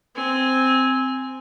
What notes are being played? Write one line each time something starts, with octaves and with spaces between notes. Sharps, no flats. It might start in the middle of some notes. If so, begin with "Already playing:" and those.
C4 G#5